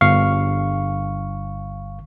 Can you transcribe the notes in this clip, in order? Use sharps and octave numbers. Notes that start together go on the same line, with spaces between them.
G1 F5 C#6